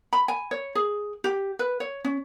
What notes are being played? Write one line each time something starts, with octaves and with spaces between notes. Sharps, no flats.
B5
G#5
C#5
G#4
G4
B4
C#5
C#4